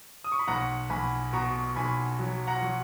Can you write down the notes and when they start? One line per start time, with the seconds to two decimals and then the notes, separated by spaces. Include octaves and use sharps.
0.24 D#6
0.32 C#6
0.39 B5
0.48 B1 F#5 A#5
0.90 B1 G#5 B5
1.33 B2 A#5 C#6
1.76 B1 G#5 B5
2.19 F#3
2.47 F#5 A#5
2.62 F#3